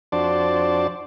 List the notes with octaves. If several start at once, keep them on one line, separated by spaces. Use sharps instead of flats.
F2 D4 F#4 C5 D5 A5